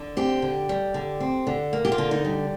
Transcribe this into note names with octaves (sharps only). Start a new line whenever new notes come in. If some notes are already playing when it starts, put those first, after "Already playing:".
Already playing: D3
C4 G4
D3
G3
D3
C4
D3
A#3
G4
F4
D3
D#4
G3